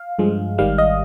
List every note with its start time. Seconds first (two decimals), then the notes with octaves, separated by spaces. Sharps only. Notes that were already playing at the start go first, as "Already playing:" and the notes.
Already playing: F5
0.19 G2 F3 G#3
0.58 G#1 G#2 D#3 G3 F5
0.78 D#5